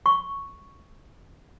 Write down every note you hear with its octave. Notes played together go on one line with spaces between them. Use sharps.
C#6